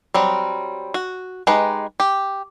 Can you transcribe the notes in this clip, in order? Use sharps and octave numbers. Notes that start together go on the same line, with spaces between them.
F#3 G3 C4
F#4
G#3 D#4 G4 B4 B5
G4